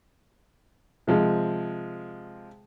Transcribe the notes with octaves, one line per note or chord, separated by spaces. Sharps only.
C3 F3 G#3